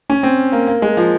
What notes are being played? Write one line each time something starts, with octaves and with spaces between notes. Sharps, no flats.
C#4
C4
A#3
A#3
G#3
F3